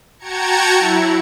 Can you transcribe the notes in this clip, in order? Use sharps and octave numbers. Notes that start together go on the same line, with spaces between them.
F#4 G5 A5 A#5 G#6 C#7
F#3 E4